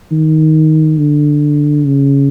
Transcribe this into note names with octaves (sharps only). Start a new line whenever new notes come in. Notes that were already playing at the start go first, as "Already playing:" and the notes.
D#3
D3
C#3